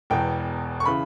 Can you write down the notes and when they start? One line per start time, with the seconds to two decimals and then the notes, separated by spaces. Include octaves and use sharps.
0.10 E1 E2 B2 G5
0.80 C#6
0.85 C#3 E3 B5